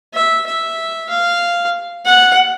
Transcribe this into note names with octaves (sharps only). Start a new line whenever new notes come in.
E5
E5
F5
F#5